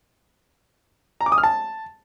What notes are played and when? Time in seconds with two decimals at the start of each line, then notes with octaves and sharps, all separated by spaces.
1.21 A#5
1.26 D6
1.32 D#6
1.38 F6
1.43 A5